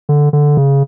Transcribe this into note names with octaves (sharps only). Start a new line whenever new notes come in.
D3
D3
C#3